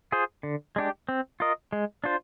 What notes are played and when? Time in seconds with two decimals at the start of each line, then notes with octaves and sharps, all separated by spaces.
0.12 F4 G#4 C5
0.43 D3
0.76 G#3 D4 G4
1.09 C4
1.40 F4 A#4 D#5
1.73 G#3
2.04 D4 F4 C5